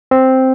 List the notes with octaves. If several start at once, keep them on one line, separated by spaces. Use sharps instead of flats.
C4